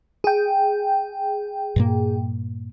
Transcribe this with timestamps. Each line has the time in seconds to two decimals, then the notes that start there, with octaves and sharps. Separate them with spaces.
0.24 G#4 G5
1.76 G2 A#2 A#3